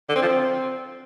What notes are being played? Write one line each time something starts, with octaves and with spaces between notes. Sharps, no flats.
D3
C4
F3
C4